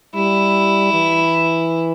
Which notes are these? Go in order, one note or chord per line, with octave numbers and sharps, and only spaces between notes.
G3 E4
E3